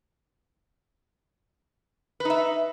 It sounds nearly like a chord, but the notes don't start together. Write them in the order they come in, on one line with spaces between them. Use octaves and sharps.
B4 D#4 E5